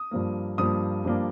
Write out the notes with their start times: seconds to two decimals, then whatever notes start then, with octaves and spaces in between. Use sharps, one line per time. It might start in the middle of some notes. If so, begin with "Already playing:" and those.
Already playing: D#6
0.11 G2 F3 A#3
0.58 G2 F3 A#3 D#6
1.05 G2 F3 A#3 D4